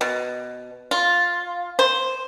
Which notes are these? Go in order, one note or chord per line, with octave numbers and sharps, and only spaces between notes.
B2
F4
C5